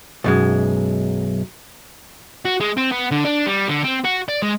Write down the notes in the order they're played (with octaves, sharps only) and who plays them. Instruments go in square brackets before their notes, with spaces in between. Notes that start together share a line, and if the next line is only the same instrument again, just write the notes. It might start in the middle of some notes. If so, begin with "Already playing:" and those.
[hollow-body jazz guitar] B1 F#2 G#3
[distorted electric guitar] F#4
G#3
C4
B3
D3
D4
G3
D3
C4
F#4
D5
G#3